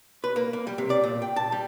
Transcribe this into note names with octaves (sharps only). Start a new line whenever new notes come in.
B4
A#3
A#3
G3
C3
D5
A#2
G5
A5
G3